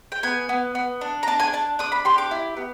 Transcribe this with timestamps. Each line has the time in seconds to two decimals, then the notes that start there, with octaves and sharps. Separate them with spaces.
0.12 G5
0.23 B3 G#5
0.49 B3
0.75 B3
1.01 D4
1.23 A#5
1.27 D4 A5
1.40 G#5
1.53 D4 A5
1.79 D4 D#6
1.92 B5
2.05 G4 C6
2.18 D6
2.31 E4
2.57 B3